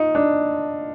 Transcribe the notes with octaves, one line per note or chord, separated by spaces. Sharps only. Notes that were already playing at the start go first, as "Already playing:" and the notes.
Already playing: D#4 F4
D4